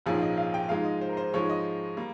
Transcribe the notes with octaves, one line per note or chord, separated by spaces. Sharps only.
A#1 G#2 F3 A#3 C#4 G#4
D#5
F5
G5
G#2 F3 G#3 F5
D#5
C5
A#4
C5
G#2 F3 G#3 C#5
D#5
G3 A#3